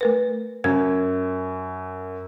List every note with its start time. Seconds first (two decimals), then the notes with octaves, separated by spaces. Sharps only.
0.01 A3 A#4 B4
0.64 F#2 G#6